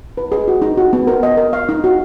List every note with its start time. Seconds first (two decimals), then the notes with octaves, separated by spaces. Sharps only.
0.17 B4
0.32 G#4
0.48 F#4
0.62 D#4
0.78 F#4
0.93 B3
1.07 A#4
1.23 D#5
1.37 A#4
1.53 F5
1.69 D#4
1.84 F#4